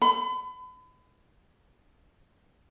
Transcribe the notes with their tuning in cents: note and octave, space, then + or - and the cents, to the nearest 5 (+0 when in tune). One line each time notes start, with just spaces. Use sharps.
B5 +35